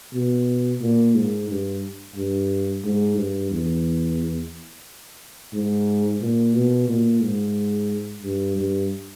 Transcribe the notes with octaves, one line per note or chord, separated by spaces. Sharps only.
B2
A#2
G#2
G2
G2
G#2
G2
E2
G#2
A#2
B2
A#2
G#2
G2
G2